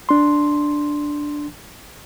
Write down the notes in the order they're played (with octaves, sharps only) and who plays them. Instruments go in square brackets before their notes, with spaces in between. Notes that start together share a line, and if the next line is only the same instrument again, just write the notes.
[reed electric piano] D4 C6